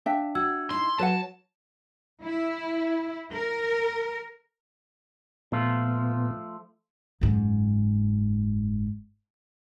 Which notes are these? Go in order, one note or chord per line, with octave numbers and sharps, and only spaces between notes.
D4 E5 F5 G5
F#4 E6 G#6
D#4 E4 C6
F#3 B4 F#5 A5
E4
A#4
A#2 F3 A3 B3 F4
F#1 G#2